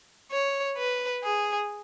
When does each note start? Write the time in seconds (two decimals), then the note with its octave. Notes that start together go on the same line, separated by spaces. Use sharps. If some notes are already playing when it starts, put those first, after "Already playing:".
0.32 C#5
0.77 B4
1.23 G#4